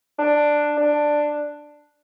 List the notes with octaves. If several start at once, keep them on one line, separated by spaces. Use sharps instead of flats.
D4
D4